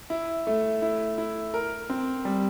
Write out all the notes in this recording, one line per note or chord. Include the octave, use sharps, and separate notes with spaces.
E4
A3
E4
E4
A#4
C4
G3